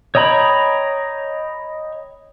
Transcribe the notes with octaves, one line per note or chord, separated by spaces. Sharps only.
C#5 D#5 G5 A#5 B5